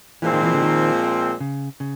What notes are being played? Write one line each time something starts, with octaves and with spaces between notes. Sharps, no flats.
A#2 E3 F3 G#3 C4
D#3
E3
D3
D#3
C#3
C#3